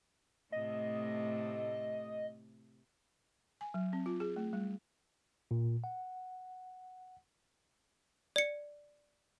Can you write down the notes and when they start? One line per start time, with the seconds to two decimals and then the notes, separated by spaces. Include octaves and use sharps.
0.52 A2 C3 A3 D#5
3.61 G#5
3.74 F#3
3.93 C4
4.06 F4
4.20 G#4
4.36 A3
4.53 G3
5.51 A#2
5.84 F#5
8.36 D5 C#7